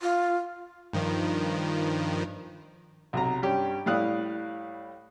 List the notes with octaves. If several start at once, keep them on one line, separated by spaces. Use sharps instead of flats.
F4
G2 D#3 F3
B1 C3 A#5
G2 C#4 G4
A2 G3 E4 F5 D#6 F#6